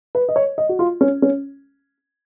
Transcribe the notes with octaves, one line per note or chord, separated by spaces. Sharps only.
B4
D#5
C#5
D#5
F#4
F4
C#4
C#4